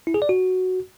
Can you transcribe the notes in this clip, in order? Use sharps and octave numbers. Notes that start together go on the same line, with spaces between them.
E4
G#4
D5
F#4